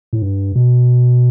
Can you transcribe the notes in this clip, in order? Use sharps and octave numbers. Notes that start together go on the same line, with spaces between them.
A2
G2
B2